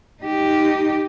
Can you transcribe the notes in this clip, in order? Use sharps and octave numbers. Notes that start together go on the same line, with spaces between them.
D#4 G4